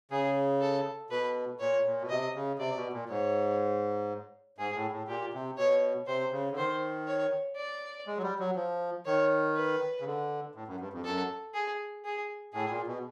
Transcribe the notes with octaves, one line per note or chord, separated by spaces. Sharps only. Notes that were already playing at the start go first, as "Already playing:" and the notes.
C#3 G#4
A4
B2 B4
A#2 C#5
A#2
B2
C3 D#5
C#3
C3 D5
B2
A#2
G#2 C#5
G#2 G#4
A2
A2
A#2 G4
C3
B2 C#5
C3 C5
C#3
D3
D#3 C5
C#5
D5
G#3
F#3
G3
F#3
F3
D#3 C#5
B4
C#3
D3
A2
F#2
G2
F2
F#2 A4
G#4
G#4
A2 G#4
A#2
B2